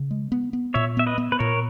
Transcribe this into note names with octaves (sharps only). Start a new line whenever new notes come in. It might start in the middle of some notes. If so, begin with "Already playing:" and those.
Already playing: C#3
G#3
B3
B3
A#2 C#5 E5
B3 E5
B4 D#5
B3
B4
A#2 A#4 C#5